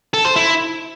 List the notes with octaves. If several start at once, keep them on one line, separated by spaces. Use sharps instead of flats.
A4
C5
E4